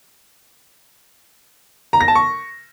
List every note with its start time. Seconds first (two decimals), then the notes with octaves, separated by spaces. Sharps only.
1.93 A#5
2.01 A#6
2.08 A5
2.15 C#6